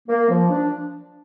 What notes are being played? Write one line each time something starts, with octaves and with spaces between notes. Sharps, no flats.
A#3
F3
D4